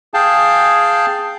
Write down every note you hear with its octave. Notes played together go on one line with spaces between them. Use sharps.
G#4 F5 G5 A5